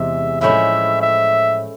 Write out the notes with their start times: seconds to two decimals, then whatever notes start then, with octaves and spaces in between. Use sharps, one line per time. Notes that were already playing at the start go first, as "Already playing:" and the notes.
Already playing: E2 C3 G#3 E5
0.41 A2 F3 G#3 C#4 E4 E5
1.02 E5